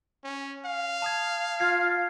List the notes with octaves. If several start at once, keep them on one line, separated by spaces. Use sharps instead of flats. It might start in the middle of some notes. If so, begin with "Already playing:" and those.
C#4
F5
A5 D#6 G#6
F4 F6 G#6 C7